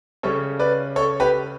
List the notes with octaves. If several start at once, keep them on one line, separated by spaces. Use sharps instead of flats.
C#3 G3 C#4 A4 C#5
B4 D5
A4 C#5
G4 B4